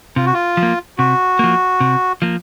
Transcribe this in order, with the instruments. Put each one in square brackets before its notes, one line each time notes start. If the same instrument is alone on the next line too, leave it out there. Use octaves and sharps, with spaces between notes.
[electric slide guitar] C3 [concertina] F4
[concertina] F#4
F4
[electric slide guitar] F3
A#3
[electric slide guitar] C3 [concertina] F#4
[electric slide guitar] F3 A#3
C3
F3 A#3